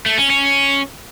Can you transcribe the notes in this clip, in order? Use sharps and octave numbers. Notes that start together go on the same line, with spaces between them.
A3
C#4
C#4